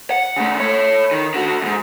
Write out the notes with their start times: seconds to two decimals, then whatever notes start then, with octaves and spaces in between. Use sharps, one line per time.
0.11 F#5
0.36 C#3 A3
0.60 A4 C#5
1.11 D#3
1.34 D3 F#4
1.62 E2 G#2